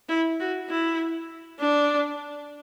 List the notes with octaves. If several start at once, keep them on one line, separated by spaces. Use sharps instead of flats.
E4
F#4
E4
D4